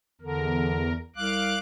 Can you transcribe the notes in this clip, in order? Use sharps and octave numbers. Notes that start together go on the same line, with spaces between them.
E2 D3 A#4
C2 F5 D6 F#6